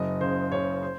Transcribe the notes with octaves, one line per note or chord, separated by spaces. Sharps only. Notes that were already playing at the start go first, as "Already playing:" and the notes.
Already playing: F#1 D#5
C#3 C5
C#3 C#5
C5